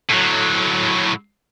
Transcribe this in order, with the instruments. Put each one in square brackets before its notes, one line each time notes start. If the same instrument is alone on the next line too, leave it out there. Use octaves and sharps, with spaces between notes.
[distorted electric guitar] A2 F#3